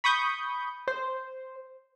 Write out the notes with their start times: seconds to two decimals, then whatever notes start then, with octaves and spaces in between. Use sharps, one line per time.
0.04 B5 C#6 D#6 G6
0.88 C5